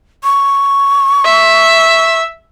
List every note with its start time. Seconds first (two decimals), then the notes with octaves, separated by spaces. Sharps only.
0.24 C#6
1.25 E5